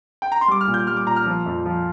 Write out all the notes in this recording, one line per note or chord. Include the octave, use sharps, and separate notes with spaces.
G5
A#5
C6
G3 D6
F6
A#2
G6
G3 F6
D6
A#2 A#5
F6
F3
F2
F3